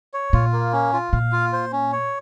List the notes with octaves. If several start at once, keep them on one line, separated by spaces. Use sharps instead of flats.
C#5
A#2 F4
A#3
C#4
F4
A#2 F5
F4
C5
C#4
C#5